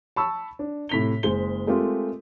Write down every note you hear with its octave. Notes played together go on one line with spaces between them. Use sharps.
A5 B5 C#6 E6
D4
A2 C3 B6 F7 G7
F#1 G#3 G#4 C5 G7
G#3 A3 C4 F4 G4 A#4